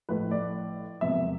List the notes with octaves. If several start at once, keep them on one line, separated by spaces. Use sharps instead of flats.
A1 A2 F3 B4
D5
E1 E2 C3 F3 E5